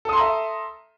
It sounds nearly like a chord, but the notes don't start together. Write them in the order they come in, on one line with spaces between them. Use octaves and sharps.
A4 D#6 C6 A#5 E5